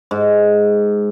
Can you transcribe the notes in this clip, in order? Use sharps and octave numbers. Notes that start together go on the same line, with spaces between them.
G#2